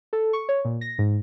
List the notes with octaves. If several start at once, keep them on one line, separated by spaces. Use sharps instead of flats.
A4
C#6
C#5
A#2
A#6
G#2